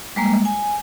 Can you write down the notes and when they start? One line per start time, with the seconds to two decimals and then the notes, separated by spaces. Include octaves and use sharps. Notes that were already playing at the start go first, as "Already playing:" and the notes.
0.16 G3 G#3 A#3
0.45 G#5